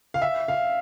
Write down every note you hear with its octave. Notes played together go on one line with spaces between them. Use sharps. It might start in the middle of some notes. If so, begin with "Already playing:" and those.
F5
E5
F5